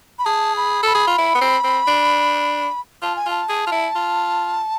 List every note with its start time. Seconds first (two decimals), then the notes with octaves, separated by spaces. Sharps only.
0.19 B5
0.25 G#4 A5
0.57 B5
0.83 A4 B5
0.94 G#4
1.07 F4
1.18 E4
1.35 B3
1.41 C4
1.64 C4
1.87 D4
3.02 F4 A5
3.16 G#5
3.26 F4 A5
3.49 G#4
3.67 F4
3.71 E4
3.95 F4